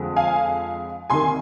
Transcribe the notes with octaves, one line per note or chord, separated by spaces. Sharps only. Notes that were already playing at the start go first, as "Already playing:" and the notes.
Already playing: F2 D3 F3 G#3
F5 G#5
C2 C3 D#3 A#3 G#5 C6